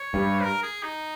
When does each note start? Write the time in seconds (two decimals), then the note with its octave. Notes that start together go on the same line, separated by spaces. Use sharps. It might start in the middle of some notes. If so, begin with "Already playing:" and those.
Already playing: C#5
0.14 G2
0.43 A#4
0.63 G#4
0.83 D#4